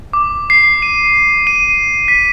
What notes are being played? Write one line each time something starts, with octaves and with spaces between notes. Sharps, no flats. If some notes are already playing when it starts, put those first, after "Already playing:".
D6
C7
D#7
D#7
B6